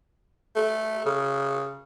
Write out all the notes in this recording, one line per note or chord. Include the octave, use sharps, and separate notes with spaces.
A3
C#3